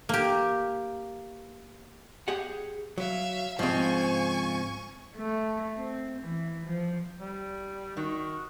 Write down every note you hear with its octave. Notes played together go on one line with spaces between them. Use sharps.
A#3 G4
G4 G#4 F#5
F#3 E5 F5
G#2 C#3 F3 C4 G#5 C#6
A3
C4
E3
F3
G3
D#3 F#4